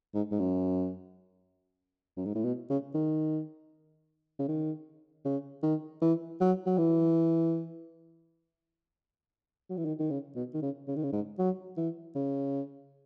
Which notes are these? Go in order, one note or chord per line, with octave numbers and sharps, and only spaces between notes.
G#2
G#2
F#2
F#2
G#2
A2
B2
C#3
D#3
C#3
D#3
C#3
D#3
E3
F#3
F#3
E3
F#3
E3
D#3
D#3
C#3
B2
D#3
C#3
C#3
D#3
C#3
G#2
F#3
E3
C#3